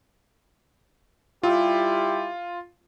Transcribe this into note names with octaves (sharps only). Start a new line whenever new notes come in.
G3 E4 F4 G4